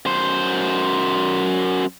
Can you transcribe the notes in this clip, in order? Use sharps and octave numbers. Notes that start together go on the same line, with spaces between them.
F#2 C5